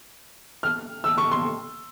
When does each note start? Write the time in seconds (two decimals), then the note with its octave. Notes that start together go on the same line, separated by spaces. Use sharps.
0.63 F6
1.04 E6
1.18 C#6
1.32 C6